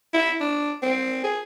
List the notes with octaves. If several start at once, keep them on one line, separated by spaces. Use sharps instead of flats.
E4
D4
C4
G#4